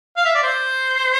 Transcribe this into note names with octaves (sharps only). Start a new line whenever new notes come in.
F5
E5
D5
C5